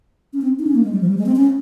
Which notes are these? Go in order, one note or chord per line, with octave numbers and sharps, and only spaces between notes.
C#4
C4
D#4
C#4
A#3
G#3
G3
F3
G3
G#3
C4
C#4